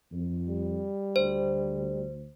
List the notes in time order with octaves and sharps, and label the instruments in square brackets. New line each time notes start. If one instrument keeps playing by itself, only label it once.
[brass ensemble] F2
[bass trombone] G3
[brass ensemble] D2 [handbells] C5